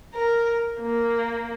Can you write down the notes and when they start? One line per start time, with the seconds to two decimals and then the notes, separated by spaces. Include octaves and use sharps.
0.15 A#4
0.80 A#3